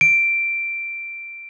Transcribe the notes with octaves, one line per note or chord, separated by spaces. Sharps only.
D7